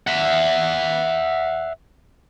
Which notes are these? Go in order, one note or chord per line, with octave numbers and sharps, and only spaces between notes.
E5 F#5